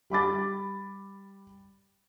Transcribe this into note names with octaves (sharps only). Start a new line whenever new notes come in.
G3 B5 D6 A6